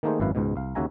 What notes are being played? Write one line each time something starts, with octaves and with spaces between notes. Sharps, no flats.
D#3 A3 A#3 D#4 G#4 C5
G#1 F#2 E4 B4 F5
C#2 G#2 B2
C2 F5
D#2 C#3 F#4 E5 G#5 A#5